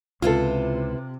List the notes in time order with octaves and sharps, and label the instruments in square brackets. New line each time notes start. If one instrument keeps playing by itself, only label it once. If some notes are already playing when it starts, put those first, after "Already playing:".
[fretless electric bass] C#2 [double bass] C3 [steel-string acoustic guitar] E4 B4 C5 [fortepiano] F4 A4